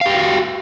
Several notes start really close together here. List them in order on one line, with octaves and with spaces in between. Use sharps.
F5 G4 G5 F#4